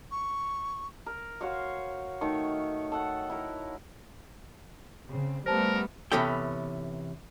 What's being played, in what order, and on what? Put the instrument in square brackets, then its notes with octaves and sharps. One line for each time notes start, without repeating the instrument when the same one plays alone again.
[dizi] C#6
[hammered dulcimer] A#4
F#4 C5 C#5 F5
D#3 A3 C#5 C#6
A4 F#5
E4 A#4
[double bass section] C#3 [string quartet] C4
[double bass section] G3 [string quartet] A3 B3 [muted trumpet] A#4 [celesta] C5 A5
[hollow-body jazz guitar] C3 E3 B3 C#4 A4 G5